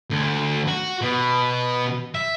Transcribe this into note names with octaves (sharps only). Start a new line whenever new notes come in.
D2
F#4
B2
E5